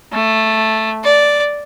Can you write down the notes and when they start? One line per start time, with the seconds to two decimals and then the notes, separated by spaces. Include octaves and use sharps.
0.13 A3
1.04 D5